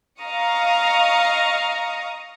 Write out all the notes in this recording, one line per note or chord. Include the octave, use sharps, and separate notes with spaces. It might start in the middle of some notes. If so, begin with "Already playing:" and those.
D#5 F5 A#5 C#6 D#6